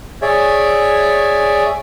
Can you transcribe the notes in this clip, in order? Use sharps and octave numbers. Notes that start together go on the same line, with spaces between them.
G#4 C#5 D5 E5